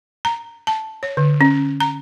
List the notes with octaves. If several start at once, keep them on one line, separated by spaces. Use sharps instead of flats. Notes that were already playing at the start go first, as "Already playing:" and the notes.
A#5
A5
C#5
D3
C#4
A#5